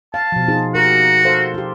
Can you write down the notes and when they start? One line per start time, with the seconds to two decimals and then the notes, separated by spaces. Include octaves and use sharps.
0.14 F5 A5
0.32 B2 F3
0.48 D#4 F4 G#4
0.75 F#4 G4 A#4
1.24 A4 C5 F5
1.54 F4 G4